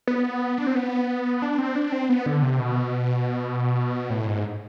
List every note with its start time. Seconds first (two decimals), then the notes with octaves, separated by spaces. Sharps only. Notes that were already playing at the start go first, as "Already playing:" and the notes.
0.07 B3
0.58 D4
0.67 C4
0.75 B3
1.42 D4
1.59 C4
1.75 D4
1.92 C4
2.09 B3
2.26 D3
2.43 C3
2.59 B2
4.10 A2
4.27 G#2